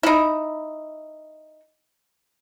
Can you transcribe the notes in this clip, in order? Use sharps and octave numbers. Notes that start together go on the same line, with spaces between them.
D#4 E4